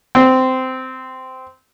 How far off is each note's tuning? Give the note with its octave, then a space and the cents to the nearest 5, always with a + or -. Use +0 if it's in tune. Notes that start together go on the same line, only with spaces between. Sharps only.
C4 -15